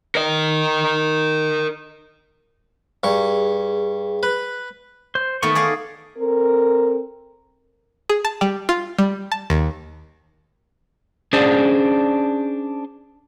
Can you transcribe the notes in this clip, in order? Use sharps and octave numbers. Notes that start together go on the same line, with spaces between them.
A#4 D#5
G2 G#4 C#6
B4
C5
D#3 A3 B3 C#6
G#4 D5 F5
C4 A4 A#4
G#4
A5
G3
F4
G3
A5
D#2
C#4 D4 G#4 C5 D5